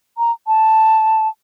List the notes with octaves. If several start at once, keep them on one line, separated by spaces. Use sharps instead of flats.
A#5
A5